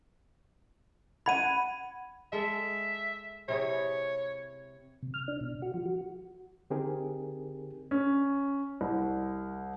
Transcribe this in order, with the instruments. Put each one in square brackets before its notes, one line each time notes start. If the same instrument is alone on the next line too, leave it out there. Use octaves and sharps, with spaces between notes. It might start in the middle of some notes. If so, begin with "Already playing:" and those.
[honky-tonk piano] F#5 G#6 [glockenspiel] B5 D#7
[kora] G#3 A4 [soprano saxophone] E5
[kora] C3 E4 G#4 [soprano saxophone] C#5
[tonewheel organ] C3
F6
D4
B2
F#4
F3
F#4
[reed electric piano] D3 C4 D#4 G4 G#4 A#4
[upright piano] C#4
C2